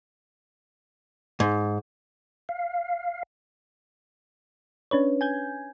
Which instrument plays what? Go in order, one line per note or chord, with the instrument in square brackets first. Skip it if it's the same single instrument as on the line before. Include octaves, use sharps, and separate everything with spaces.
[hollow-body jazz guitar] G#2
[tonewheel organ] F5
[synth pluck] C#4 D4 B4 C#5
G#5 G6 G#6